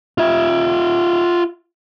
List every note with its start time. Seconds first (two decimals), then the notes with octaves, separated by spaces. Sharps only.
0.18 F4 E5